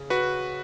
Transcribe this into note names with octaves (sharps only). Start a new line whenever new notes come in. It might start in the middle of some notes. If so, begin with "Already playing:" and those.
Already playing: C#3 C#4
F#4 B4